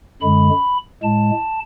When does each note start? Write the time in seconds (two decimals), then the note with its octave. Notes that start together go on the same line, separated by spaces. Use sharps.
0.21 F#2 D3 G#3 B5
1.03 A2 G#3 A5